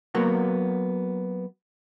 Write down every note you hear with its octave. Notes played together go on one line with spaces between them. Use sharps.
F#3 A#3 B3 F#4